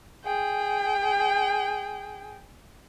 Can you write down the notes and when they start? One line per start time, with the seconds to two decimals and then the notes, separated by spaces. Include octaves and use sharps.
0.25 G#4 G5